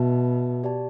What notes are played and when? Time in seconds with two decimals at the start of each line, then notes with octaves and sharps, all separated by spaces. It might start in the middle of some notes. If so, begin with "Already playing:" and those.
Already playing: B2 B3 F#4 B4 E5 A5
0.64 G4 D5 A5